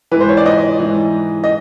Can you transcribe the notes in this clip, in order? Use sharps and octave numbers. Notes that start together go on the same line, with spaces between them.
G#2 E3 B4 C5
C#5
D5
D#5
G#2 E3
D#5